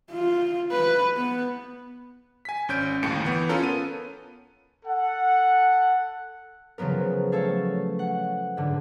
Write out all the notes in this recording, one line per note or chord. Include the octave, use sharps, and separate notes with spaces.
F4
B4
B3
G#5 B6
G#1 C#4 G6 D7
G1 D#2 A2 C#7 D7
E3 B3
C#4 F4 A4 A#4
B3 D#7
A4 F#5
C#3 F3 F#3 B3 A#4
A3 A4 C#5 F5
F#5
G#2 D3